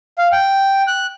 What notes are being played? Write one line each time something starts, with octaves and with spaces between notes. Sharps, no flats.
F5
G5
F#6